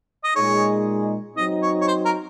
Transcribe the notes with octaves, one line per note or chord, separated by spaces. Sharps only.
D#5
A#2 G#3 D#4 G#4 C#5
F#3 C4 D#4 D#5
C#5
C#5
C5
A#4